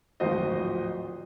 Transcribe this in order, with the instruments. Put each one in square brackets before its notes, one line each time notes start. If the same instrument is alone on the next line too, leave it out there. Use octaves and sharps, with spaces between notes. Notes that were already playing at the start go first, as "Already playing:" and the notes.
[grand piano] D1 G#1 F3 F#4 C5 D#5